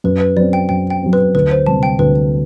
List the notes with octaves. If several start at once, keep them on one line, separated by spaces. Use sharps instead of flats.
F#2 B4
B4
F#3 C4 D5
G5
F#2 G5
G5
F#3 C4
B4
D2 B4
C5
C3 G3 A5
G5
D2 B4